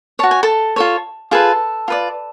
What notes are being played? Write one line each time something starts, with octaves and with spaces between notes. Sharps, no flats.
F#4 C#5 A5
G#5
A4 A5
F4 A4 C#5
F4 G#4 A4 B4 A5
F4 B4 D5